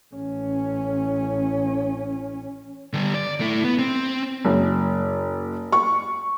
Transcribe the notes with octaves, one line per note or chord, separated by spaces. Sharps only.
A1 C#4
D3 G3
D5
A3 E4
B3
C4
F#1
C#6